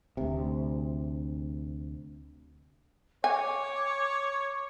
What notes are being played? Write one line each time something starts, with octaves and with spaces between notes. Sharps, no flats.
D2 C3
C#5 G#5 D6